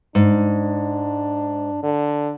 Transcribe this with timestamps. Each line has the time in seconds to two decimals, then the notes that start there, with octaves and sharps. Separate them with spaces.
0.15 G#2 D4
1.83 D3